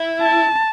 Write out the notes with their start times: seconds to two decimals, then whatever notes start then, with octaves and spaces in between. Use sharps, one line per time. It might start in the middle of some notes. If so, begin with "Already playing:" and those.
Already playing: E4
0.21 A5